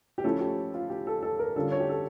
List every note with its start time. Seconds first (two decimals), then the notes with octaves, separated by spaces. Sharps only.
0.18 G4
0.24 F3 A3 C#4 E4 A4
0.41 G4
0.74 F4
0.90 G4
1.07 A4
1.23 A4
1.39 A#4
1.56 D3 G3 C#4 F4 A4
1.72 C#5
1.80 G4
1.89 A4